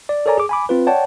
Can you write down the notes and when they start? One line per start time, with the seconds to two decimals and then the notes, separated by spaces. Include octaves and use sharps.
0.09 D5
0.26 A4 A#4 C#5 D5 G#5 A#5
0.38 G#4 D6
0.49 G#5 B5 D6
0.69 C4 F4 B4
0.87 C#5 D5 F#5 G5 A5